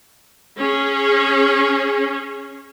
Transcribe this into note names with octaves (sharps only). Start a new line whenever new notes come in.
C#4 G#4